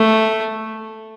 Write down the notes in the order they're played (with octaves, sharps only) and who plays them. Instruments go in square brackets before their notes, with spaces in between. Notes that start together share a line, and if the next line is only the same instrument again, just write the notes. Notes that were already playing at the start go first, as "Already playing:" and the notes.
Already playing: [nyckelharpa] A3